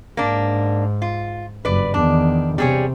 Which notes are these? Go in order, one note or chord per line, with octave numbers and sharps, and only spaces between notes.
G#2 A#3 D4
F4
F#1 G2 B4 D5
E2 D#3 D4
C3 G3 G#4 C#5